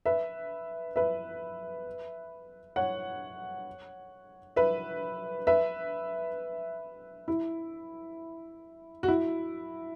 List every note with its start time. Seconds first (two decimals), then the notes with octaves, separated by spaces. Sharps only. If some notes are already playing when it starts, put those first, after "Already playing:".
0.06 B4 E5
0.96 B4 E5
2.76 C#5 F#5
4.56 B4 E5
5.47 B4 E5
7.28 E4
9.03 F#4
9.08 E4